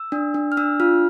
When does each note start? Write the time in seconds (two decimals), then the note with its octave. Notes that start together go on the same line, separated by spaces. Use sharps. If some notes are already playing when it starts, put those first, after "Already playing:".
Already playing: E6
0.12 D4
0.34 D4
0.52 F6
0.57 D4 E6
0.80 F4 F6